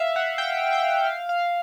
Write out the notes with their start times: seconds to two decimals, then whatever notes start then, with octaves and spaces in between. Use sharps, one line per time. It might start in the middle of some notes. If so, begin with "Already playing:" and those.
Already playing: E5 F5
0.16 F#5
0.38 G5
0.72 G5
1.07 F5
1.29 F5